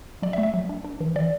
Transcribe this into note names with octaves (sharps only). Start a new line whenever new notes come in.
F#3 D5
E5
A3
E5
F#3
D4
D4
E3
E3 D5